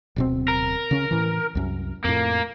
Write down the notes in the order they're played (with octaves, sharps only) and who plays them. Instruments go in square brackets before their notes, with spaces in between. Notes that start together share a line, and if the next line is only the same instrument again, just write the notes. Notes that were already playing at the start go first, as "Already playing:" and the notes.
[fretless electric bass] D1 B2 C4
[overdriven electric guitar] A#4
[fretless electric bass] C#3 C#4
A2 E3
C2 F#2
[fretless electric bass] F2 A2 [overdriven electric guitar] A#3